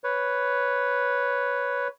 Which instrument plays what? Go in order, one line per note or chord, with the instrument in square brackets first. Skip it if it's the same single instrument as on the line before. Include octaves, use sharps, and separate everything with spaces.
[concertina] B4 C#5